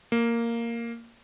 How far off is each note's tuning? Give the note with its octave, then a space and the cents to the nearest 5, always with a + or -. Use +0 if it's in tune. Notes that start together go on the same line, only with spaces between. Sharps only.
A#3 -5